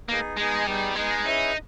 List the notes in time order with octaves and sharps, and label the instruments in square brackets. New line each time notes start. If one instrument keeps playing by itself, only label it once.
[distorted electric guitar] A#3 [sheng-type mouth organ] B3 D#4 G#4
[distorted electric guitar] G#3 [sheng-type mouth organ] B3 D#4 G#4
[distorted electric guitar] G3 [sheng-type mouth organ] B3 D#4 G#4
[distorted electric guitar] G#3 [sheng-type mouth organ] B3 D#4 G#4
[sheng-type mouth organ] C#4 E4 G#4 B4 [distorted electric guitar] D#4